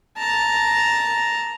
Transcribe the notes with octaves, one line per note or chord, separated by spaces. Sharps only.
A5 A#5